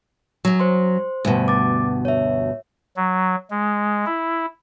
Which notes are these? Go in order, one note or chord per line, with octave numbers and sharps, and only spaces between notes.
F#2 F#3
C5 C6
D2 G2 B2
D6 A6
C#5 E5
F#3
G#3
E4